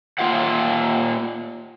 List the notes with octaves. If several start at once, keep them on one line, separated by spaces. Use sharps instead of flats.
A#3 F4 E5 F#5